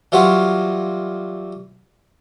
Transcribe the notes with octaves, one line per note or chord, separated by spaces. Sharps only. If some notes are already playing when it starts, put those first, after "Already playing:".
E3 F#3 G3 F4 F#4